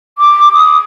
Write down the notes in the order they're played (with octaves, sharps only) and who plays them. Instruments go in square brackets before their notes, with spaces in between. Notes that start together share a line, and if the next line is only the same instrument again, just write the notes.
[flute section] D6
D#6